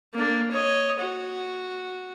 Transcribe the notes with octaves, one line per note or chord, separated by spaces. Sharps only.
A#3 D4
C#5 D#5
F#4